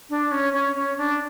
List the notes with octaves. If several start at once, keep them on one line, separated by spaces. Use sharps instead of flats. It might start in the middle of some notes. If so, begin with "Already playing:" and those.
D4
C#4
C#4
C#4
D4